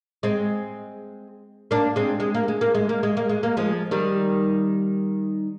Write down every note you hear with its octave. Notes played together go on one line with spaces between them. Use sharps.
G#3 C4
A#3 D4
G#3 C4
G#3
A#3
G#3
A#3
G#3
A#3
G#3
A#3
G#3
A#3
F3 G#3
D#3 G3